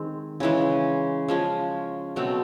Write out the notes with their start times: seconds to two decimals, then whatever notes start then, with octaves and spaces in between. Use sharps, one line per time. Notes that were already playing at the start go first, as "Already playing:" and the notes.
Already playing: D#3 G#3 C4
0.40 C#3 E3 G#3
1.28 F3 G#3 C#4
2.16 B2 F#3 A3 C4